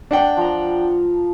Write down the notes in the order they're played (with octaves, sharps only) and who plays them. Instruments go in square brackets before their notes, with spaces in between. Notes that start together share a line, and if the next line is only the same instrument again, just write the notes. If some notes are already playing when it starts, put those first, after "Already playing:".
[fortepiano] D4 F#5 G5
[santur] F3 A#5